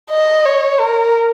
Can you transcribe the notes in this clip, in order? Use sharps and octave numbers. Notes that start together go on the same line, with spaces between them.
D#5
C#5
A#4